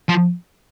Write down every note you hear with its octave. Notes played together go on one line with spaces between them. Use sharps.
F3